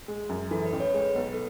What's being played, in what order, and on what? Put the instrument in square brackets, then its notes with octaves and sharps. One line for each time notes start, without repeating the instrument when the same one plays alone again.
[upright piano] G#3
F#2
[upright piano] E3 [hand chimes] A4
[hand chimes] B4
[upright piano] A1
[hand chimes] C#5
[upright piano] G#3 [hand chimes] B4
[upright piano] B1 [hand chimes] B4
[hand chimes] A4